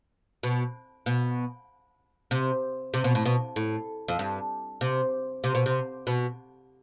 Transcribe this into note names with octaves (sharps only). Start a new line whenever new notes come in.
B2
B2
C3
C3
B2
A2
B2
A2
F2
G2
C3
C3
B2
C3
B2